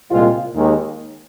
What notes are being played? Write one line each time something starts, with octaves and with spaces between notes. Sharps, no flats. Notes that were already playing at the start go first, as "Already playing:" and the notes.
C2 A#2 G#3 C4 F4
D#2 D#3 G#3